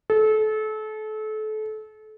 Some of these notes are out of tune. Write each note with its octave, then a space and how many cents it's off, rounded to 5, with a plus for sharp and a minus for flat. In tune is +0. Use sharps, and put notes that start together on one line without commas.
A4 -30